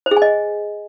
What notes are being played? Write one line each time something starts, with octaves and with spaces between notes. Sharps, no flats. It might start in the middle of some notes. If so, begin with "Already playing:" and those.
C5
G#4
G#5
D#5